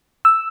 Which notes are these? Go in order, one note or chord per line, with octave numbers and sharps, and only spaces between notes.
E6